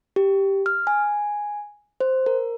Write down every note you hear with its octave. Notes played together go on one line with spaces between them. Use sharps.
G4
F6
G#5
C5
A#4